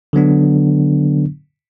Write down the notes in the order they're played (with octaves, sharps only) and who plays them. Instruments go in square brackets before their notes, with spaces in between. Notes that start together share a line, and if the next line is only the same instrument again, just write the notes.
[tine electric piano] D3 F#3 B3 D4